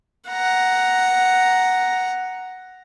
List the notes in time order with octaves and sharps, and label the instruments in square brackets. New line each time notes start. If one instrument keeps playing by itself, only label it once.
[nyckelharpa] F#5 A#5